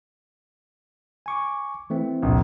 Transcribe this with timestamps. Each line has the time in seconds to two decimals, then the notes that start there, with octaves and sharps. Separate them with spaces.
1.26 G#5 C#6 D6
1.90 E3 A3 C4
2.23 F1 A#1